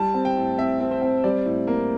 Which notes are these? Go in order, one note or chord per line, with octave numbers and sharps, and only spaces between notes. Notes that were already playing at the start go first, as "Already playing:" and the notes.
Already playing: G3 A5
C4
G5
A2
C4 E5
C4
C5
C4
G3 D5
A2
A#3